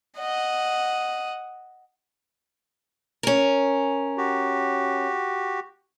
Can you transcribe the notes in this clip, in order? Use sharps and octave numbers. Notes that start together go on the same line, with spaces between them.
D#5 F#5
C#4 A#4
F#4 G4